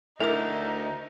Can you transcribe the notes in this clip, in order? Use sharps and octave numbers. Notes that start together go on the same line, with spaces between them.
D2 D#4 E4 A4 A#4 D6